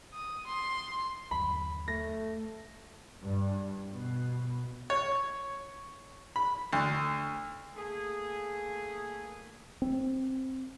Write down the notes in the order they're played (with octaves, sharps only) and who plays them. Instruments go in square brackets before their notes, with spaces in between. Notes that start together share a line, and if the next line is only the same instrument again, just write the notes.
[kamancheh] D#6
C6
[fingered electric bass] G1 D#2 F#3 [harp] B5
[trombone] A3 [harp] A#6
[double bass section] G2
B2
[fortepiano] C#5
B5
D2
[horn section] A3 A#3 G#4
[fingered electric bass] C4